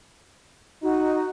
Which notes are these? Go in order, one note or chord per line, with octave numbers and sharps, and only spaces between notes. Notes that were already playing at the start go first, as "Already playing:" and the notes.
D#4 F#4